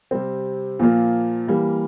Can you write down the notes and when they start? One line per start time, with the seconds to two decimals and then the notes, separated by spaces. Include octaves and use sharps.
0.11 C3 G3 C4
0.80 A#2 F3 A#3 F4
1.48 E3 G3 A#3